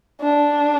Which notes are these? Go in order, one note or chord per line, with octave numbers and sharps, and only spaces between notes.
D4